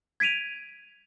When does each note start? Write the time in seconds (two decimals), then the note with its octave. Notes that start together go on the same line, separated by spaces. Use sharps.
0.20 G#6 B6 D7 D#7 F7